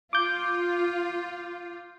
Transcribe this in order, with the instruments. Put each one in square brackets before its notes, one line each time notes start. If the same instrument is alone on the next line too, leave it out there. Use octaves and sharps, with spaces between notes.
[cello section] F4 [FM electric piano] D6 G6